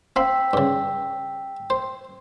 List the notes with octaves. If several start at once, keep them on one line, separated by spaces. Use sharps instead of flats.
C4 F5 G5 B5 E6 B6
G2 C#3
C5